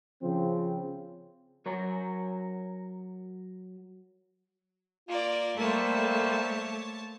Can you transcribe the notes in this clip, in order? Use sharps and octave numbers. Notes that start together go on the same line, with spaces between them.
C#3 F3 C4
F#3 A#4 C#5
A#3 F4 D5
G3 A3 A#3 C5 C#5 A5